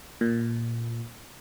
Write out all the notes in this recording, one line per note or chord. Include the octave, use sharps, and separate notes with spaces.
A#2